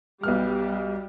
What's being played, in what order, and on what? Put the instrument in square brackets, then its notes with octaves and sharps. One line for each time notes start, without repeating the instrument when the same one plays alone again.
[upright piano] B1 B3 F6 [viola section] G3